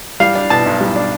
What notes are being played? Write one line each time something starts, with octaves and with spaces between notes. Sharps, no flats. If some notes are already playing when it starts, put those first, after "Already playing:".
G3 F5
D4
B2 A5
B1
G3
D4